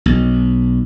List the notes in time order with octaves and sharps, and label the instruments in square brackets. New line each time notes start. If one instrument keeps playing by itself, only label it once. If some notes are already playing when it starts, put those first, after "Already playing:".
[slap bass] B1